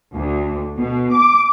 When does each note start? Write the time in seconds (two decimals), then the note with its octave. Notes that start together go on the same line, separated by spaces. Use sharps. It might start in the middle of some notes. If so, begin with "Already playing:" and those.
0.15 D2
0.76 B2
1.12 D6